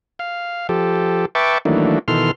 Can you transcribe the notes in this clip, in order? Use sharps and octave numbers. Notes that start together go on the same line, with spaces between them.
F5
F3 G4 A4
B4 E5 G5 A5 C#6 D6
D#3 E3 F#3 A3 A#3 D4
B2 D#3 E3 A4 C6 F6